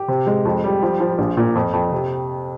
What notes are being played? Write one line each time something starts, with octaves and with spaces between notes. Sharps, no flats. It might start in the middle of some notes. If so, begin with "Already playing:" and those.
Already playing: G4
C3
G#3
F2
G3
F3
F3
A#1
A#2
F2
F2
C3